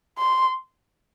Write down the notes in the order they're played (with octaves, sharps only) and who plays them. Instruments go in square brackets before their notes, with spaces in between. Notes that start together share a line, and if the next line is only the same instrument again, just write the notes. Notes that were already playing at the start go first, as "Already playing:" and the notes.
[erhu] C6